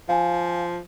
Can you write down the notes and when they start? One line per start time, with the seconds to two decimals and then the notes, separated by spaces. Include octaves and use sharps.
0.09 F3 F5 G#5